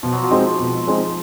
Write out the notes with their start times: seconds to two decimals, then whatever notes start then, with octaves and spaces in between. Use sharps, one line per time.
0.03 B2 F3
0.13 F#3
0.22 F3
0.31 G#3 C4 D#4
0.59 B2
0.87 G#3 C4 D#4